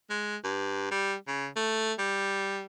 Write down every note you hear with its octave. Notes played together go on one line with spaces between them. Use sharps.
G#3
G2
G3
C#3
A3
G3